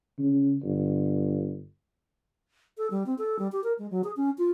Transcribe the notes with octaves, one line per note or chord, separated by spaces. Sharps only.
C#3
G1
A4
G3
C4
A4
G3
G4
A#4
G#3
F#3
G#4
C#4
F4